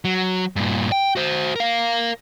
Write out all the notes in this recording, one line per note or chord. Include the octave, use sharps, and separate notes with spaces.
F#3
G2 A#2
G5
F#4 C5
A#4 F5